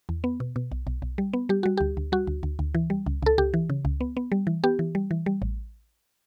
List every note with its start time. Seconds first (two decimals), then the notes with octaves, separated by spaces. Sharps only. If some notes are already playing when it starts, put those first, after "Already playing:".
0.09 E2
0.24 B3
0.40 B2
0.56 B2
0.72 B1
0.87 B1
1.02 B1
1.18 G3
1.33 B3
1.49 G3 G4
1.63 G3 F#4
1.77 D2 G4
1.97 D2
2.12 G3 F#4
2.27 D2
2.43 D2
2.59 D2
2.75 E3
2.90 G3
3.06 C#2
3.22 C#2 A4
3.38 C#2 G4
3.54 E3
3.70 C#3
3.85 C#2
4.01 B3
4.17 B3
4.32 G3
4.47 E3
4.64 B3 G4
4.79 E3
4.95 G3
5.11 E3
5.26 G3
5.42 A1